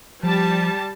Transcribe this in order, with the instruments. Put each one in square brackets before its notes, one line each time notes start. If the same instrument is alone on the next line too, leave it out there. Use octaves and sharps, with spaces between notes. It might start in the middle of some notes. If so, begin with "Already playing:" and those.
[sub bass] F3 [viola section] G3 A5